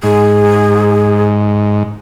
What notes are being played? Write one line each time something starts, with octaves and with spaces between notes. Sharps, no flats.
G#2 G#4